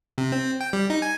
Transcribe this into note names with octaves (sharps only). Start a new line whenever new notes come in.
C3
C4
G5
G3
D#4
G#5